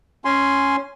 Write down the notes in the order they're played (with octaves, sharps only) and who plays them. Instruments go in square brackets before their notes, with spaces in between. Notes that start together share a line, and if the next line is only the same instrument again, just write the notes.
[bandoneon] C#4 G#5 C6